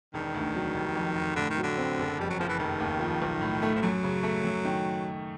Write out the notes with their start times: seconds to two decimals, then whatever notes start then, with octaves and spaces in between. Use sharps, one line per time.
0.14 E1 D#3
0.34 D2
0.55 F#3
0.75 F1
0.96 F2
1.16 F1
1.36 A2 D3
1.50 D#3
1.58 F#3
1.63 D3
1.78 C4
1.99 F#1
2.19 F2 G3
2.30 F#3
2.39 F#1 F3
2.49 E3
2.59 F1 D#3
2.80 D#2
3.00 F3
3.22 B1
3.41 A2
3.62 A3
3.75 F3
3.82 F#2 F#3
4.04 C#3
4.23 A3
4.45 F#2
4.65 D#3